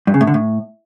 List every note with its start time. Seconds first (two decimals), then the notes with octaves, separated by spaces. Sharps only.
0.07 G2
0.14 C#3
0.21 A2
0.27 D3
0.34 A2